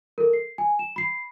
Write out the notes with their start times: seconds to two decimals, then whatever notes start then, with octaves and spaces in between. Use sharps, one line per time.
0.18 A4 A#4
0.33 C7
0.58 G#5
0.79 E7
0.96 B5 C7